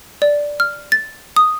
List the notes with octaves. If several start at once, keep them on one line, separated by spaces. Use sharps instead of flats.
D5
F6
A6
D#6